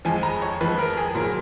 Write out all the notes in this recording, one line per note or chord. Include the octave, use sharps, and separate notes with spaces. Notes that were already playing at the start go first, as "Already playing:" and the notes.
F2 F3 G#3 G#5
A#5
C#5
F2 F3 G#3 B4
A#4
G#4
A#2 F#3 A#4